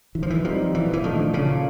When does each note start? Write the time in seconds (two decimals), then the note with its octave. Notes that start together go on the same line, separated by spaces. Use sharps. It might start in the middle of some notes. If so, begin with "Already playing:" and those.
0.15 D#3 E3
0.23 F3
0.30 E3
0.44 F3 G3 C4 D#4 G4
0.74 A#2 E3
0.93 E3
1.03 D#3 F3 A3 D4
1.33 A#2 C#3